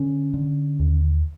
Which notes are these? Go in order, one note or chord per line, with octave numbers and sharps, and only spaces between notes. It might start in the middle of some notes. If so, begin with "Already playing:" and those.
Already playing: D3 C#4
D3
D#2